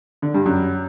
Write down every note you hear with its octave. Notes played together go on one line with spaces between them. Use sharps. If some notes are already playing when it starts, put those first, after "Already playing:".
D3
G2
F#2